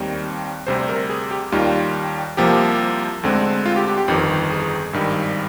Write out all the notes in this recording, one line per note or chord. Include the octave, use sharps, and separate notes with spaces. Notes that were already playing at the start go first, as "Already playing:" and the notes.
Already playing: D#2 D#3 G3 C4
D2 C3 G3 C5
A#4
G#4
G4
D#2 D#3 G3 F4
C2 C3 F3 A#3 G4
D2 D3 G#3 C4
F4
G4
G4
G4
G1 F2 D#3
G#4
G#1 G2 D#3 G3